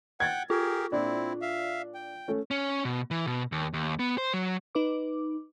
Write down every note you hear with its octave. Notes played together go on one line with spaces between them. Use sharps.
F#5 G5 G#6 A6
F4 G4 G#4 A#4
A#2 C4 D4 E4
E5 F5
G5
A3 C#4
C#4
B2
E3
B2
D#2
D#2
B3
C5
F#3
D#4 B4 D6